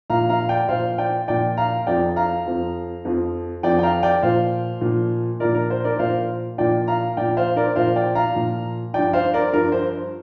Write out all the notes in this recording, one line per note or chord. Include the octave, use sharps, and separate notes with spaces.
A#2 F3 F5 A#5
F5 A#5
D5 G5
A#2 F3 C5 F5
D5 G5
A#2 F3 D5 G5
F5 A#5
F2 F3 D5 G5
F5 A#5
F2 F3
F2 F3
F2 F3 D5 G5
G5
F5 A#5
D5 G5
A#2 F3 C5 F5
A#2 F3
A#2 F3 A#4 D5
A#4
C5
A#4 D5
A#2 F3 C5 F5
A#2 F3 D5 G5
F5 A#5
A#2 F3 D5 G5
C5 F5
A#4 D5
A#2 F3 C5 F5
D5 G5
F5 A#5
A#2 F3
G2 F3 D5 G5
C5 F5
A#4 D5
G2 F3 A#4
C5